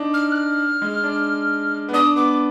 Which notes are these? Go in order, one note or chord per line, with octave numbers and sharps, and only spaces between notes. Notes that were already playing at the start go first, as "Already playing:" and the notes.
Already playing: D4 D#4
F6
F#6
F6
G#3
D4
B3
D4 D#6
B3 D6